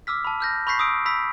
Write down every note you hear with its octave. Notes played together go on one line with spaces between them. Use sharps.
D6 E6 F6 B6
A5 B5
F6 G6 A#6
B5 C#6 G6 B6 C7
D#6 E6 D7
B5 E6 B6